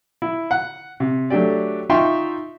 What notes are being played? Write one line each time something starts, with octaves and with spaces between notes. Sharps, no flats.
E4
F#5
C3
F#3 A3 D4 G4 D5
D#4 F4 E5 G5 C6 C#6